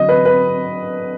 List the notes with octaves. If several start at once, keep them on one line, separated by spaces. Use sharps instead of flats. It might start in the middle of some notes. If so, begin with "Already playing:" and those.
Already playing: D3 F#3 D#5
B4
B4